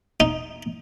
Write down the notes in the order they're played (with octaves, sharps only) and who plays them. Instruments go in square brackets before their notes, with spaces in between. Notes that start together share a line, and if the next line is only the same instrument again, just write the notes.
[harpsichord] D#4